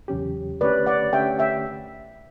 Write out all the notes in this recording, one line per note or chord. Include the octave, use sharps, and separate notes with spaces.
E2 C#3 F#3 C#4 G4
D3 A3 C#4 G4 B4 C#5 D5
D5 F#5
D3 A3 C#4 G4 C#5 E5 G5
E5 G5